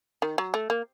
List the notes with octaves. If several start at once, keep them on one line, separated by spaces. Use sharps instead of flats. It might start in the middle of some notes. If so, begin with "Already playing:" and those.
D#3
F#3
A3
A#3